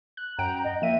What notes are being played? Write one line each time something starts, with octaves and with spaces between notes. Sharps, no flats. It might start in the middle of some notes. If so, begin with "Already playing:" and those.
F#6
F#2 F#5 G5 A#5 D7
D#5
F3 A#3 E5 D#7